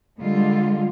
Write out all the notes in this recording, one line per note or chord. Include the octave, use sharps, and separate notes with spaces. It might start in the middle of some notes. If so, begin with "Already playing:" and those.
D3 G3 G#3 F4